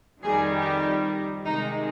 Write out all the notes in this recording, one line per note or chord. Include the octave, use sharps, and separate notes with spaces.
F2 D#3 G3 G#4
G4
C3 D#3 G#3 D#4